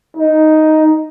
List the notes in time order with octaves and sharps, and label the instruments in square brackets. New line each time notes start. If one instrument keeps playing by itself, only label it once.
[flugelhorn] D#4